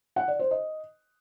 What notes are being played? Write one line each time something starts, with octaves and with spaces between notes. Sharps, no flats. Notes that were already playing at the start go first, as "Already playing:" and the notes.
F#5
D5
C5
D#5